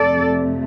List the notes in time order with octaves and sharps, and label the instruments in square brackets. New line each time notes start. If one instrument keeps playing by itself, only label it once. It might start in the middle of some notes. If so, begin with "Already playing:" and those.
Already playing: [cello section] F2 C3 A3 A4 D5